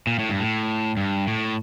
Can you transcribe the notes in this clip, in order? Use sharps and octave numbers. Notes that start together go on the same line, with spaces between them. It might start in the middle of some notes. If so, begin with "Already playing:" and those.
A#2
A2
G2
A2
G2
A2